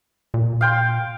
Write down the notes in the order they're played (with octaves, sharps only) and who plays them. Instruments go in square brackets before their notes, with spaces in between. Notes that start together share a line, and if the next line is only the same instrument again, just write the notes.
[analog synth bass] A#2
[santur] F5 G5 C6